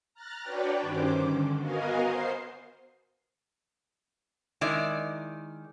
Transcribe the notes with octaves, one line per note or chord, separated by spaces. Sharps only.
A#5 F6 F#6 A6
D4 F#4 B4 C#5 D5 G5
G2 D#3 C#4 C5 D6
D3
B3 F#4 A#4 D#5 F5 G#5
C5 C7
D#3 G#3 E4 D5